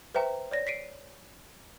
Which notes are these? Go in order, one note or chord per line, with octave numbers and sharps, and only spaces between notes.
B4 C5 E5 G5 A#5
C#5 D5 A#6
B6 C7 D7 D#7